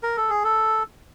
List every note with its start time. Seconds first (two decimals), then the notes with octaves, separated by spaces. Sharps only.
0.03 A#4
0.17 A4
0.30 G#4
0.44 A4